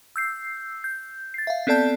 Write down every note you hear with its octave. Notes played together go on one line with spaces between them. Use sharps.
E6 G6 C7
G6
A6 C7
E5 F5
B3 C4 A4 D5 A5 G6